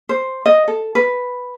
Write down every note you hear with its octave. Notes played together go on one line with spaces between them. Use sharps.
C5
D#5
A4
B4